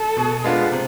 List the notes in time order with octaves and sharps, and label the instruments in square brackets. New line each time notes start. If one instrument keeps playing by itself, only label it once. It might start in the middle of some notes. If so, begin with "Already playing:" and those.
Already playing: [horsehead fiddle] A4
[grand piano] B2
G#3 B3 D4 F4
C3